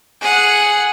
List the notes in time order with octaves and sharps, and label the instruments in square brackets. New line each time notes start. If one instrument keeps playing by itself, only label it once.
[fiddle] G#4 F#5